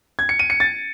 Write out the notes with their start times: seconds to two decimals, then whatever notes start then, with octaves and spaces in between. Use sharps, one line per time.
0.19 G#6
0.29 C#7
0.39 D#7
0.50 C#7
0.60 A6